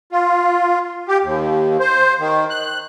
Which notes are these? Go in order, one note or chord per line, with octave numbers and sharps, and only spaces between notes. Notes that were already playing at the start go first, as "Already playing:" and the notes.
F4
G4
D#2
C5
D#3
F#6